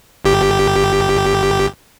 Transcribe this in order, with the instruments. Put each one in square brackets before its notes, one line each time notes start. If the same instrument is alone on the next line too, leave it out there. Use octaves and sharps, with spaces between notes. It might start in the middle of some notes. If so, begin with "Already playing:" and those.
[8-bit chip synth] G1 G4